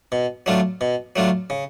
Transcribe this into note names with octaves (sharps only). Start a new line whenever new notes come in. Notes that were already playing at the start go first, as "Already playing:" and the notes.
B2
F#3 A3 D4 F4
B2
F#3 A3 D4 F4
C#3